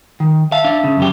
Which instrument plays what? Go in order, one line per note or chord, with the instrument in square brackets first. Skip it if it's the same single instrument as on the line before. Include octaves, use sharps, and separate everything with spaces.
[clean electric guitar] D#3
[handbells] E5 A5 [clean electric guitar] F5
[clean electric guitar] D4 F5
C#3
F#2 C#3 G4